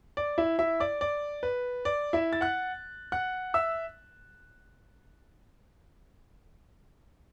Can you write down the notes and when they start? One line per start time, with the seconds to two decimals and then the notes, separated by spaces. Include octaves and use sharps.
0.17 D5
0.38 E4 E5
0.59 E4 E5
0.80 D5 D6
1.01 D5
1.43 B4
1.85 D5
2.13 E4 E5
2.33 A6
2.41 F#5 F#6
3.12 F#5 F#6
3.54 E5 E6